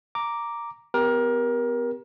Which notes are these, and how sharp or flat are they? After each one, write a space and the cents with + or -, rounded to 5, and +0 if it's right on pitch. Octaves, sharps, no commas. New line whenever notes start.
A#5 +0 D6 +0
B3 +35 G4 +0 A#4 +25